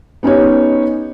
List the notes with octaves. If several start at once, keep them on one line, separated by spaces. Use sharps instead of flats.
B3 C#4 D#4 G4 C#5